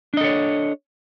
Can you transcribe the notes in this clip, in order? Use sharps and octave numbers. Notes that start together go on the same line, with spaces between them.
D4 A4 C#5 D#5